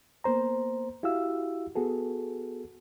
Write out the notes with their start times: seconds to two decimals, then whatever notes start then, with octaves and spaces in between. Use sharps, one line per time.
0.24 A#3 B3 C5 A#5
1.03 E4 F#4 G4 F5 E6
1.75 B3 F#4 G#4 A4